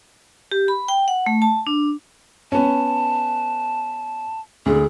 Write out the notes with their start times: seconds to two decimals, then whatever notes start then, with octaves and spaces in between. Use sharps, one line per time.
0.52 G4
0.68 B5
0.88 G5
1.08 F#5
1.26 A3
1.42 A5
1.67 D4
2.52 B3 C#4 A5
4.66 D2 D3 G#4